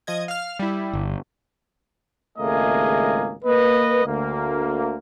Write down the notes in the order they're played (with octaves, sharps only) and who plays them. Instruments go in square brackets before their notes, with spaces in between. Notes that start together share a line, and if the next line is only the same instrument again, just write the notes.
[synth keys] F3 D#5 G#6
F5 F6
G3 E4
[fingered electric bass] G1
[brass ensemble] G#1 C#2 A3 A#3 G#4 D#5
A#3 B4 D#5
D2 A#3